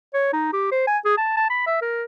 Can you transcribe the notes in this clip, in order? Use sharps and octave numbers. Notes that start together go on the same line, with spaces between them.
C#5
D#4
G4
C5
G#5
G#4
A5
A5
B5
E5
A#4